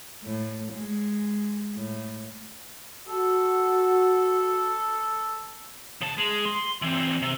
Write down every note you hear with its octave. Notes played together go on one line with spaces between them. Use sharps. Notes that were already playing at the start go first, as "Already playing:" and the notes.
A2
G#3
A2
F#4 A4
C#3 A5
G#3
C6
E3 C4
C3